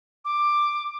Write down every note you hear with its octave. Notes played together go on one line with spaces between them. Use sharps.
D6